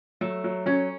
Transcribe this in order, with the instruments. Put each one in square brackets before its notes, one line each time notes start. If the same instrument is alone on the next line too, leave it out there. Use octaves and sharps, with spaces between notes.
[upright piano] F#3 [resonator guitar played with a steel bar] A3
[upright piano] F#3
[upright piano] F#3 [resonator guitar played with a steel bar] C#4